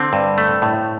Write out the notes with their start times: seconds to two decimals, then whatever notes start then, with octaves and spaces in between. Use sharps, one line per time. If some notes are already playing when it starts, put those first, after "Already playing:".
Already playing: D3 C4
0.13 G2
0.38 A3
0.62 A2